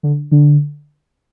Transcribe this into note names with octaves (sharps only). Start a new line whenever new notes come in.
D3
D3